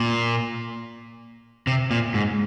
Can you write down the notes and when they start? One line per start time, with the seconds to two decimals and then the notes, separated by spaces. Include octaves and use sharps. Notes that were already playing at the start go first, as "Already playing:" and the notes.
Already playing: A#2
1.67 C3
1.91 A#2
2.14 G#2